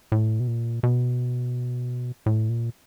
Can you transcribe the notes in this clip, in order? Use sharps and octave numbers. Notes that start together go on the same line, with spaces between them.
A2
B2
A#2
B2
A2
A#2